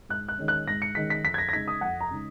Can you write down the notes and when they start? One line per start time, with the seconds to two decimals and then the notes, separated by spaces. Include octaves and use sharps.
0.09 G#2 F#6
0.28 F#6
0.38 D#3 G#3 C#4
0.48 F#6
0.67 G#2 A#6
0.82 C#7
0.95 D#3 G#3 C#4 B6
1.10 B6
1.24 F2 B6
1.34 G#6
1.38 A#6
1.49 A#6
1.53 C#3 G#3 D#4 B6
1.68 D#6
1.81 F2 F#5
2.01 A#5
2.10 C#3 G#3 D#4